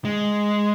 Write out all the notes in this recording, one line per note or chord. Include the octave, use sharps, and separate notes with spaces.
G#3